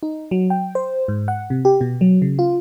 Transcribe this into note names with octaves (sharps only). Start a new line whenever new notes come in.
D#4
F#3
G5
C5
G#2
F#5
C3
G4
B2
F#3
C#3
F4